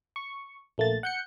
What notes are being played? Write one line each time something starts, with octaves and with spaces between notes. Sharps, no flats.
C#6
A#1 A3 A#3 A6
F#5 G6 C#7